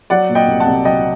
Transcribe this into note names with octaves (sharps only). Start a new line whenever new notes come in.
F#3 D5 F#5
A#2
D#5 G5
C2
F#5 A5
C2
F#3 D#5 G5